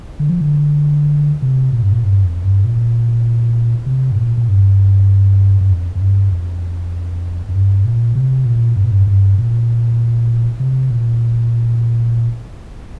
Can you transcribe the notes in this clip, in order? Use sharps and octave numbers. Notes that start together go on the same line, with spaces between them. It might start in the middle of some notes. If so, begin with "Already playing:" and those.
D3
F3
D3
C3
A#2
G2
A#2
G2
F2
G2
A#2
C3
G2
A#2
A#2
G2
G2
F2
F2
G2
F2
F2
G2
A#2
C3
A#2
G2
A#2
G2
G2
A#2
C3
A#2